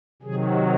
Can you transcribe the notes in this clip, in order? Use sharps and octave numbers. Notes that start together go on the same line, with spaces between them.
C3 D#3 F#3 G#4